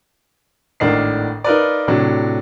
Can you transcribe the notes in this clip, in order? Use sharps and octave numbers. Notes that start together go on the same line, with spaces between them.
G#1 A2 D4 A#4 D#5 C7
D#4 F4 A#4 B4 D5
A2 C3 F#3 D4